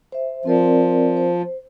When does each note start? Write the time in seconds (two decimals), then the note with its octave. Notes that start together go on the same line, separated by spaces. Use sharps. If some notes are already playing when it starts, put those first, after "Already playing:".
0.12 C5 E5
0.45 F3 C4 A#4 D5
1.17 C5